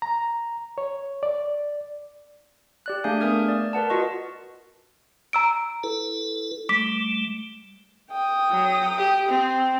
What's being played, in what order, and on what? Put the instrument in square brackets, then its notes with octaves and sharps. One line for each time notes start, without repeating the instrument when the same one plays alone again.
[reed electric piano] A#5
C#5
D5
[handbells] G4 D5 F#6
A3 D4 G#4 F5 G#5 G6
A3 B3 A#4 D#6 F6 G#6
D5
A#4 B4 F#5 A5
F4 F#4 D#5 C#6
[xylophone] A#5 E6 D7
[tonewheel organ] E4 A4 B4
[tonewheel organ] G3 A3 [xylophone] D6 B6
[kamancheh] G5 D#6
[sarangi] F#3
G4
C4